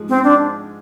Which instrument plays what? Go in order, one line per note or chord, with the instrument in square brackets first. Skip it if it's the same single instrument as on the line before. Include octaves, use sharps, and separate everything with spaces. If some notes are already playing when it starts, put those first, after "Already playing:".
Already playing: [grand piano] G#2 F3 G#3 G#4
[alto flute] C4
D4